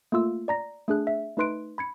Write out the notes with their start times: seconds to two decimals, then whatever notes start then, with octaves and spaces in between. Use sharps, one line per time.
0.12 A3 A#3 F4 E6
0.48 D5 A#5 A#6
0.88 A3 D4 G#4 F#6
1.07 E5
1.37 A3 D#4 B4 C6 F#6 D7
1.78 B5 G#6 C#7